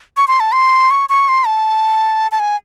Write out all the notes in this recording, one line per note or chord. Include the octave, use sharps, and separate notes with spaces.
C#6
C6
A5
C6
C#6
C#6
C6
A5
A5
G#5